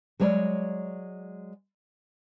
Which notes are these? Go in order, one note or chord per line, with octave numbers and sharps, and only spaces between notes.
F#3 G#3 C#5 D5